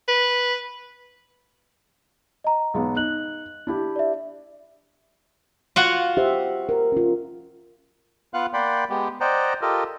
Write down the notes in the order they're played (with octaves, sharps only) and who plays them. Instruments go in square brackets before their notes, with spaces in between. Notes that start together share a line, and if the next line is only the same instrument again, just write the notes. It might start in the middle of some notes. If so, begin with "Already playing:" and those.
[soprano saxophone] B4
[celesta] D#5 A#5
[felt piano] B1 G#3 B3
[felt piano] D#4 [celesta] F#6 F#7
[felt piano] D4 E4 G4
[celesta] D5 E5
[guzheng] F4 F#4 F#5
[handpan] G4 C5 E5
A#4
C#4 F4
[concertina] B3 F4 F5 F#5 F#6
A#3 D5 F#5 G5 B5 C6
G#3 B3 G4
C5 D5 D#5 F#5 G5 A#5
F4 G4 A4 A#4 D#5